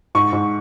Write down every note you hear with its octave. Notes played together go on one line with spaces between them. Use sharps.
G#2 C#6
G#2